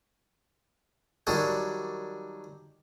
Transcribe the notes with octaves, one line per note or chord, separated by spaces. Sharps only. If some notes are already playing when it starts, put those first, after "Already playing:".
D#3 F#3 G3 D4 F#4 G#4